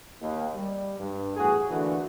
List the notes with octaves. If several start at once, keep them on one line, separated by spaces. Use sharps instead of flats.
D#2
G3
G2
E2 A2 F#4 G#4
D3 E3 A3 A#3 D4 F#4